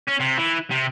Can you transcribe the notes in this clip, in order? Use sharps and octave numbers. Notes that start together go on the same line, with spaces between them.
C#4
C3
E3
C3